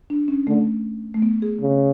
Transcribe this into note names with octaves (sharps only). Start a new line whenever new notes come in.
D4
C#4
D3 A3
A3
B3
G#4
C#3